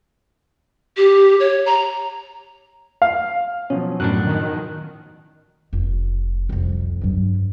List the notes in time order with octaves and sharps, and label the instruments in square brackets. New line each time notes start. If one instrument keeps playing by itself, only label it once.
[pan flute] G4
C#5
A#5
[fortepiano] F5
[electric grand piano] B2 F3 F#3 [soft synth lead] C#4
[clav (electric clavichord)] F#2 A2 D4 [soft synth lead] F#6
[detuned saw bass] D#3
[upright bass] F1
C2 F2
G2 F#3